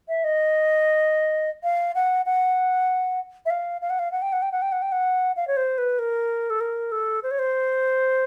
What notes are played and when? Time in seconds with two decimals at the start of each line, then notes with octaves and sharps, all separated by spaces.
0.08 E5
0.24 D#5
1.64 F5
1.95 F#5
2.26 F#5
3.46 E5
3.50 F5
3.81 F5
3.90 F#5
3.99 F5
4.12 F#5
4.22 G5
4.33 F#5
4.42 G5
4.52 F#5
4.62 G5
4.72 F#5
4.82 G5
4.92 F#5
5.36 F5
5.48 C#5
5.57 C5
5.78 B4
5.99 A#4
6.50 A4
6.61 A#4
6.92 A4
7.23 C5
7.31 C#5
7.39 C5